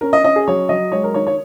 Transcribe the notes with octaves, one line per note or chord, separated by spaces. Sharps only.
C#4 A#4
D#5
C#4 D#5
G#4
F#3 C#5
F#3 D#5
G#3 C#5
A#4
D#3 C#5
C#5